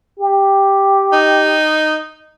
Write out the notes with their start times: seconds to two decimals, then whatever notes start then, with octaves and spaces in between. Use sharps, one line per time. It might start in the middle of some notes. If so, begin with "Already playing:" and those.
0.19 G4
1.12 D#4